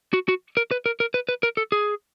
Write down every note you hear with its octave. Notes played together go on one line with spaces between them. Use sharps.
F#4
F#4
A#4
B4
A#4
A#4
B4
B4
A#4
A4
G#4